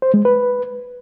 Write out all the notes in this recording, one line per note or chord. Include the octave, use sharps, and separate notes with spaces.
C5
G#3
B4